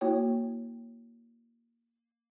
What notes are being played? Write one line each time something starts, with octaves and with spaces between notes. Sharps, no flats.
A#3 E4 F#4 C#5 G5